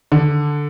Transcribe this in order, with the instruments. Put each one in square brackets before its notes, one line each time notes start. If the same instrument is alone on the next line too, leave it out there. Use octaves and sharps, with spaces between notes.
[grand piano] D3